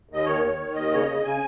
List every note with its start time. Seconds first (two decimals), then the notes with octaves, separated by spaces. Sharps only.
0.09 D#2 D#5
0.26 D#3 C#5
0.42 D#3
0.58 D#3
0.75 D#2 D#5
0.92 C#3 C#5
1.00 D#5
1.08 C#3
1.24 C#3 G#5